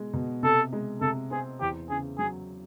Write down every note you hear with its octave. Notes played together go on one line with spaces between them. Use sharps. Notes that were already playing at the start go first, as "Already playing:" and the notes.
Already playing: B2 G#3
B2
C3 A4
G#3
C3 A4
C4 G#4
E2 G4
C#3 G#4
F#3 G#4